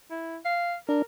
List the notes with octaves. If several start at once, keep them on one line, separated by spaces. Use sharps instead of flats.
E4
F5
D4 A#4